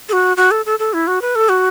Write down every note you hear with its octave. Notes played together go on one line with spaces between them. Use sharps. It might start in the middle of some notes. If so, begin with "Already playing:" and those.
A4
F#4
F#4
A4
A4
A4
E4
F#4
B4
A4
F#4